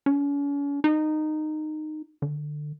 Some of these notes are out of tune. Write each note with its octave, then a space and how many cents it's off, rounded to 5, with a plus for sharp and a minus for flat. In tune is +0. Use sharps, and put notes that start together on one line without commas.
C#4 +40
D#4 -15
D3 +20